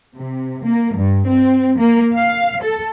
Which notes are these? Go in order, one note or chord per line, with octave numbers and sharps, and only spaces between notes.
C3
A#3
G2
C4
A#3
F5
A4